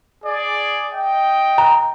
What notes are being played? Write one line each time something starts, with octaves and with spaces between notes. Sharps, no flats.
G#4 D5
D#5 G5
A#5